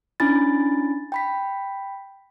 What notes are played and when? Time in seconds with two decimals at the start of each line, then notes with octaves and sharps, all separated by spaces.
0.20 C#4 D4 E4 G#5 B5 A6
1.12 G5 B5 B6